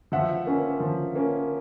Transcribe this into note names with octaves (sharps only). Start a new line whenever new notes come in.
F3 E5 F#5
A#3 C#4
F3
A#3 C#4